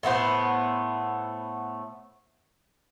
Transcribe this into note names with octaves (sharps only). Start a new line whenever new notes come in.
A2 A3 B3 C5